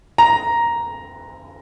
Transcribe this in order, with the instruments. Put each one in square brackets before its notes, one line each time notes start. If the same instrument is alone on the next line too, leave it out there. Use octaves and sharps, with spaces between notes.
[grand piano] A#5